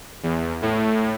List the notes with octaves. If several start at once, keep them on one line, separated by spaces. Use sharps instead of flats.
E2
A2